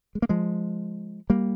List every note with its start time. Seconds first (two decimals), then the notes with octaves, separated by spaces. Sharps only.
0.15 G#3
0.22 A#3
0.29 F3 G#3
1.30 G3 A#3